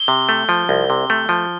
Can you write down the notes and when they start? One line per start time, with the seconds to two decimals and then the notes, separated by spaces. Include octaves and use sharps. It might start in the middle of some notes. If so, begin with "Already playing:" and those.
Already playing: G7
0.08 C3
0.29 A3
0.49 F3
0.69 C2
0.90 C3
1.10 A3
1.29 F3